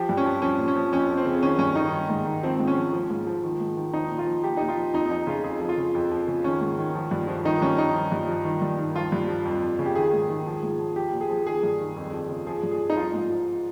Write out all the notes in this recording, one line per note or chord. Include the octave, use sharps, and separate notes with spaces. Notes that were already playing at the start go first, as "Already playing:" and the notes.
Already playing: F3 G4
G2
C#4
F3
F3 C#4
A#2
C#4
F3
F2 C#4
F3
C4
C#3
D#3 C#4
G2 C#4
D#3 D#4
D#3
G#2
D#3
F3 C4
G#2
C#4
F3
F3
G#2
F3
D#3
G#2
D#3
F3 D#4
A#2
F4
F3
F3 G4
A#2 D#4
F4
F3
F2 D#4
F3 D#4
C#3 F4
F2 G#4
F3
F4
C#3
F2
F3
C#3
D#3 C#4
G#2
D#3
F3
G2
F3
D#3 D#4
G2 C#4
D#3 D#4
F3
G2
F3
D#3
G2
D#3
F3 F4
G2
F3
F2
F3
C#3
G4
D#3 G#4
G#2
D#3
F3
G#2
F3
F3 G4
A#2
G#4
F3
D#3 G#4
G2
D#3
F2
F3
C#3
F3 G#4
G2
G#4
F3
D#4
F3 F4
G#2
F3